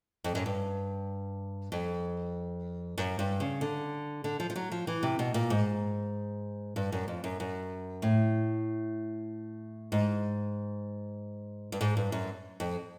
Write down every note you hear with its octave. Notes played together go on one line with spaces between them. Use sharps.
F2
F#2
G2
F2
F#2
G2
C#3
D3
D3
F3
F3
F#3
F3
E3
C3
B2
A#2
G#2
G2
F#2
F2
F#2
F#2
A2
G#2
G2
G#2
G2
F#2
F2